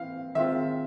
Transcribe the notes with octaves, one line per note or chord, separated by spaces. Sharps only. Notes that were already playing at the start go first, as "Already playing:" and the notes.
Already playing: E3 C4 F5
D#3 G#3 C4 F4 E5